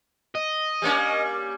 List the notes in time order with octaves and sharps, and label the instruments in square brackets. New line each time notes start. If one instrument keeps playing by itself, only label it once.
[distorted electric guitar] D#5
[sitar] G3 A#3 C#4